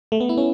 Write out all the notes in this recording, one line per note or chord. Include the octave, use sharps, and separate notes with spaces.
A3
B3
E4
C#4